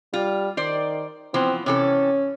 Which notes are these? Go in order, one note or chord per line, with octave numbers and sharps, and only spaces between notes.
G3 F4
D#3 C5 D5
E3 F3 B3 C4
C3 E3 C#4 A4